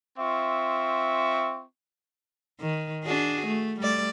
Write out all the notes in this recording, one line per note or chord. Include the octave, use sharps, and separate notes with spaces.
C4 F4 E5 C#6
D#3
D4 F#4 G#4
A3
G3 A3 D5